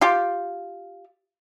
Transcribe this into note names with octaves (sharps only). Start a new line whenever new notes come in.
F4 G4